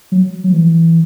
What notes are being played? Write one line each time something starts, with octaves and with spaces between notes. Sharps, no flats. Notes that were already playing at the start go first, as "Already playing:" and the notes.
F#3
F#3
E3